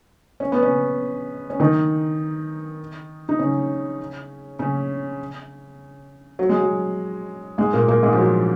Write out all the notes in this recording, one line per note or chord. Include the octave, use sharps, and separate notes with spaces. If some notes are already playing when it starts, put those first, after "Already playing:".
C#4
B3
C#3 C#4
C#4
D#3 D#4
D#4
C#3 C#4
C#3 C#4
F#3
G#3
F#3
G#2 G#3
A#2 A#3
A#2 A#3
G#2 G#3
F3
F#3